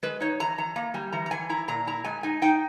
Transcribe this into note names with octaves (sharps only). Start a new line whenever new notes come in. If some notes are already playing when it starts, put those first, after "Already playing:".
G#3 B4
D#4 C#5
E3 A#5
E3 A#5
A#3 A#5
G3 G#5
E3 A#5
A#5
E3 G#5
E4 A#5
A#2 A#5
E4 A#5
G#3 G#5
D#4 G#5
D#4 G5